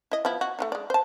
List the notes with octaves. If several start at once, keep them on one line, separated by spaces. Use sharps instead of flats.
E4 D#5
F3 B3 E4
F#4
A3 D4 D#4
G#3 D5
C5 A5